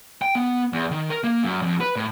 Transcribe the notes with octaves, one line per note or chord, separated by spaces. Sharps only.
G5
B3
E2
D#3
A#4
A#3
F#2
F2
B4
A2